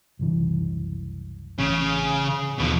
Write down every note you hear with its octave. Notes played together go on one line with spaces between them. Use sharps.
F#1 C2 E3
A1 C#3
D#2 B2 F3